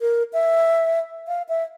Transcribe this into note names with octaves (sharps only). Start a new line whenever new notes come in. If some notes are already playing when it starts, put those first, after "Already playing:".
A#4
E5
F5
E5